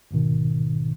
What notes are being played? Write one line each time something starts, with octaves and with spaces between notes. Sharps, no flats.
A#1 G#2 B2 D#3